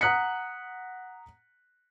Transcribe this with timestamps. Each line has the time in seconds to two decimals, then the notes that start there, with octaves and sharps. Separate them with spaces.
0.01 F#5 A#5 D#6 F#6 B6 C#7